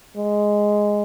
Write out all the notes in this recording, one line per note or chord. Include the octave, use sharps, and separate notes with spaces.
G#3